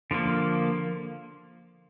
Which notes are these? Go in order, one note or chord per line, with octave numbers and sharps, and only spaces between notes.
D3 F3 A#3